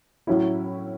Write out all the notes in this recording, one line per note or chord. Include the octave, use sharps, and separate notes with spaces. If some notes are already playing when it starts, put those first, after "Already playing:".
A2 F#3 C#4 E4